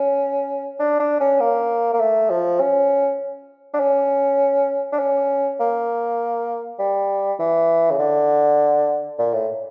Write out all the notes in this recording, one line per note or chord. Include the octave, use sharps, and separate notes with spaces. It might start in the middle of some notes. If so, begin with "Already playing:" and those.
Already playing: C#4
D4
D4
C#4
A#3
A#3
A3
F3
C#4
D4
C#4
D4
C#4
A#3
G3
E3
C#3
D3
A#2
A2